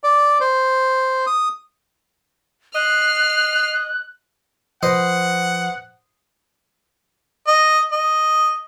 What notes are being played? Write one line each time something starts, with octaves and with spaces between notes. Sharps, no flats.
D5
C5
D#6
D#5 F6 F#6 C7
F3 B4 C5 D#5 F#5
D#5
D#5